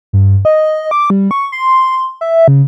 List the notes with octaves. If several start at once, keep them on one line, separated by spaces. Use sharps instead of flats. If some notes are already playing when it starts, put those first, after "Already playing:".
G2
D#5
D6
G3
C#6
C6
E5
C#3